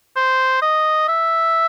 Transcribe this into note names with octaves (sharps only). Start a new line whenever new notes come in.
C5
D#5
E5